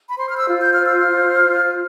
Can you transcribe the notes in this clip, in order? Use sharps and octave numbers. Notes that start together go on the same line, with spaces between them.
B5
C5 C6
F6
E6
F4
G6
F6
C5 E6
F6
F4
F4